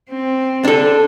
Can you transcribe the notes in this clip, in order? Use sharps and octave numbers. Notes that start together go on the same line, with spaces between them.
C4
D4 A4